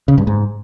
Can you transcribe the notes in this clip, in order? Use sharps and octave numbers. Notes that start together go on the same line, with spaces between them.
C#3
G2
G#2